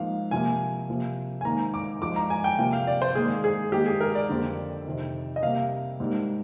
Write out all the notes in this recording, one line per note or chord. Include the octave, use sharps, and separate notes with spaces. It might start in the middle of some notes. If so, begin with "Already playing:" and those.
Already playing: G#2 F3 A#3 F5
C3 F3 A#3 G#5
C3 F3 A#3
G#5
G#2 D#3 A#3 A#5
D6
G#2 F3 G#3 D6
A#5
G#5
G5
C3 F3 A#3 G5
F5
D5
C5
G#2 D#3 A#3 G#4
G#4
G#2 D#3 A#3 G4
G#4
A#4
D5
F2 D3 G3 A#3
F2 C3 D#3
D#5
C3 G3 A#3 F5
G#2 G3 A#3